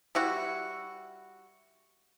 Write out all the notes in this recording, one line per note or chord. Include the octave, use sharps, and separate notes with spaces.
G3 E4 F#4